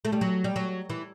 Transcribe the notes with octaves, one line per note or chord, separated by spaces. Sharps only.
A3
G3
F#3
G3
F#3
E3